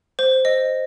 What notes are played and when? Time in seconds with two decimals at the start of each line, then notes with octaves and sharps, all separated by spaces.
0.19 C5
0.45 D#5